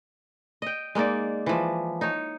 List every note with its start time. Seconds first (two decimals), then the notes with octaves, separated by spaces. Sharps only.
0.62 D#5 G5
0.95 G#3 A#3 D#4 D5
1.46 E3 F3
2.01 D#4 C#5